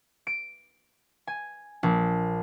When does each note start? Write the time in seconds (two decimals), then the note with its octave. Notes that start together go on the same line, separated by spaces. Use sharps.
0.27 D7
1.27 G#5
1.83 A#1